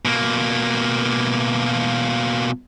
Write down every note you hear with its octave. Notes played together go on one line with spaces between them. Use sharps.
B2 A#3